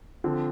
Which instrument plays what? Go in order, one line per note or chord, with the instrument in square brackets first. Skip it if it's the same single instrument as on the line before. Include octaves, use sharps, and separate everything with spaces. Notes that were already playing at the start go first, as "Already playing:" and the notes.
[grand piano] D3 F3 C4